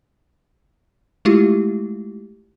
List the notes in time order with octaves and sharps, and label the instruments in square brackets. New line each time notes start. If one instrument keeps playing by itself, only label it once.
[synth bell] G#3 A3 E4 F4 G4